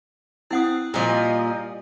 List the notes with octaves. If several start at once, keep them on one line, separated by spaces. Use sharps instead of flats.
C4 E4 B4 F#5 D#6
A#2 F3 G3 D#5 G#5